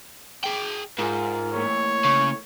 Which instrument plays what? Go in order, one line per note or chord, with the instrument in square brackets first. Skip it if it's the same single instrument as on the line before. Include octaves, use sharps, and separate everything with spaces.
[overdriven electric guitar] G#4 G5
[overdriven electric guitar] G#2 [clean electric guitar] F4 G#4 [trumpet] A#4
[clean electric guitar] E3 A3 A#3 [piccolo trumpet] C#5
[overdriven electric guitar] C#3 [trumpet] C#6